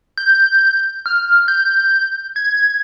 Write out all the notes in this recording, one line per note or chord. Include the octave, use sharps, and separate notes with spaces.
G6
F6
G6
G#6